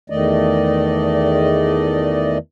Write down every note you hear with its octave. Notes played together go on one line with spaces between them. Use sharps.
E2 D#3 A3 D5 D#5